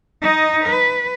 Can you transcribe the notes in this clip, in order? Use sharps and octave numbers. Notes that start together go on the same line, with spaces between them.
D#4 D#5
B4